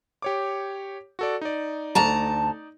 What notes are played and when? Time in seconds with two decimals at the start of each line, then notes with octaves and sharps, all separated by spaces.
0.22 G4 C#5 D6
1.19 F#4 A4 D5
1.41 D#4 D5
1.95 D2 A5 A#5